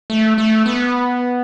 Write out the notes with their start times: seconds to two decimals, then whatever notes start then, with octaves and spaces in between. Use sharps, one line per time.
0.10 A3
0.38 A3
0.66 B3